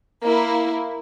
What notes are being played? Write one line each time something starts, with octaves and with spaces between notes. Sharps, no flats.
A#3 E4